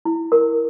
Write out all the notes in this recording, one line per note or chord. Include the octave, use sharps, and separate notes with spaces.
E4
A#4